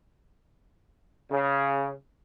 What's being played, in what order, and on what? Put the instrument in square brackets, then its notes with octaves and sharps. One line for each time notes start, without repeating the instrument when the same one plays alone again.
[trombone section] C#3